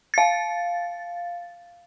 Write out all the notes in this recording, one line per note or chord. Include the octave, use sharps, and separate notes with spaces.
F5 A6